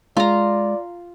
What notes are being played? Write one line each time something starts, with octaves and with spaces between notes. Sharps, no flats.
G#3 F4 D5 A#5